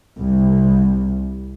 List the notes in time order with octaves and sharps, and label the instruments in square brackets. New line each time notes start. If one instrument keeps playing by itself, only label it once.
[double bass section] C2